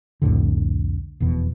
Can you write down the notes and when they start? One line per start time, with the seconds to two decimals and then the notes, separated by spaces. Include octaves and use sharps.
0.22 C2 F2 A2 D3
1.20 F1 E2 B2